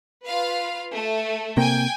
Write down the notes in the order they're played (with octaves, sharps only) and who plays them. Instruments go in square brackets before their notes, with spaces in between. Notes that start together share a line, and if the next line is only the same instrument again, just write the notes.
[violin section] F4 B4 F5
A3
[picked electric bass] C3 A#3 [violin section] G5 G#5